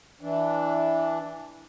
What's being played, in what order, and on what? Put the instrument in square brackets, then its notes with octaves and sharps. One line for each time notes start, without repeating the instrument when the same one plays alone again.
[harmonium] E3 D4